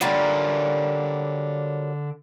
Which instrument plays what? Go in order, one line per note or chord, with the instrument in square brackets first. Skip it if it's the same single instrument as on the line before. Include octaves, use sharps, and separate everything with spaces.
[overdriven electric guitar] D3 F4 [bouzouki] F#3 G3 A#3